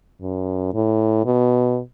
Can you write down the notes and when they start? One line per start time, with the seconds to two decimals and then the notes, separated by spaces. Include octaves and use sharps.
0.21 F#2
0.74 A2
1.25 B2